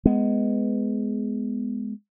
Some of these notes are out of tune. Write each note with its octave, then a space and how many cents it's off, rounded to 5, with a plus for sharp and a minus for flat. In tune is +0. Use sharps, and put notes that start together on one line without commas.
G#3 +10 B3 +15